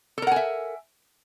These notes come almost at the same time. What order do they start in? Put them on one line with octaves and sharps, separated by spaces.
A4 A#4 F#5 G#5 E5